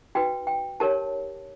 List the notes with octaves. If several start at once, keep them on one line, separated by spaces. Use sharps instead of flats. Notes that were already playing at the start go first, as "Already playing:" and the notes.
D#4 F#4 B4 G5
G5
D#4 G4 A#4 C#5 A5